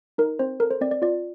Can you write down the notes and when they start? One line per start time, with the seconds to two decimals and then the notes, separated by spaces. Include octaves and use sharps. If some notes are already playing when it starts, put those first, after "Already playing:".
0.18 D#4 A#4
0.39 C4 C5
0.60 A4 A#4
0.71 C5
0.81 C4 D5
0.91 D5
1.02 F4 D5